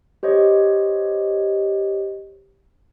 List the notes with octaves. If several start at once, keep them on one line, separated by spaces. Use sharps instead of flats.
G4 C5 C#5 D#5